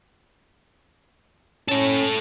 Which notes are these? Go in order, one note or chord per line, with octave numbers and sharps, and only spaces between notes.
C#4 A4 C#5